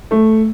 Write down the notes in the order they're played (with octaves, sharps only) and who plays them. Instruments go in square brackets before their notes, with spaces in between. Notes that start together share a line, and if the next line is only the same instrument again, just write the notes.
[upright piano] A3